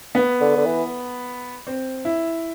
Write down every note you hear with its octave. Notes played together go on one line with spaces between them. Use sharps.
B3
D3
D3
E3
C4
E4